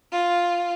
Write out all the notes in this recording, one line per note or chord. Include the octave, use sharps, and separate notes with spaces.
F4